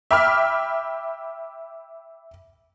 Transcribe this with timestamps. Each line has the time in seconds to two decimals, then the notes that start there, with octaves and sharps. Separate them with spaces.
0.11 E5 G5 B5 D6 F6